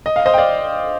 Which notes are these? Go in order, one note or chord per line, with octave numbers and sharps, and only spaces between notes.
D#5
F5
C5 D#5
G5
D5 F5